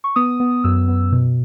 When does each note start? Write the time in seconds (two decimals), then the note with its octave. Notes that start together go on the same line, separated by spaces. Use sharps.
0.04 C#6
0.16 B3 D#6
0.40 B3
0.64 F#2 E6
0.88 B3
1.12 B2